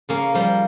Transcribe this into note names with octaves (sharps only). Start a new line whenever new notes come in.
C#3 A#3 C#4
F3 G3 A#3